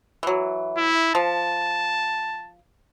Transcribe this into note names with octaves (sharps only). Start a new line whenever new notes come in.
E3 F#3
E4
F3 A5